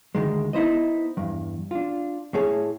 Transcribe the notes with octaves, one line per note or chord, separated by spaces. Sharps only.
D2 G#2 D#3 G#3
B3 D#4 E4 C5 D#5
E2 G2
D4 F4
A2 A3 G#4 C#5 A5